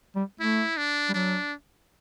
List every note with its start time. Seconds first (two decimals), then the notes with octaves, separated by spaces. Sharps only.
0.16 G3
0.40 A3 E4
0.77 D4
1.09 G3
1.14 F#3 D4